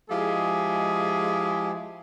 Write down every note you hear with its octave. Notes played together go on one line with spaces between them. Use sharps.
F3 G#3 E4 G4 G#4